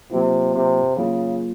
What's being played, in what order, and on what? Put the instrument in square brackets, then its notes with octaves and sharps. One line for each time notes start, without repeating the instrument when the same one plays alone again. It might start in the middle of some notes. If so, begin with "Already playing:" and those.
[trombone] C3 [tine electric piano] F#3 A#3 F4
[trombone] C3
[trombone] C#3 [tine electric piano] F#3 A#3 F4